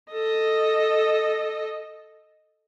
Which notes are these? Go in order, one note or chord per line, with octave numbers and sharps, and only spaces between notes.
A4 D#5